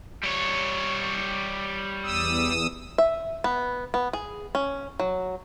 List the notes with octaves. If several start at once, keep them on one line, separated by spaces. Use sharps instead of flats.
G3 C#5
E2 D#6 E6
E5
B3
B3
G#4
C#4
F#3